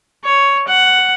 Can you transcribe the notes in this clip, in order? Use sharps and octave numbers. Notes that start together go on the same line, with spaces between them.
C#5
F#5